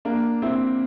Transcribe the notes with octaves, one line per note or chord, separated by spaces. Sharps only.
A#3 D4
C4 E4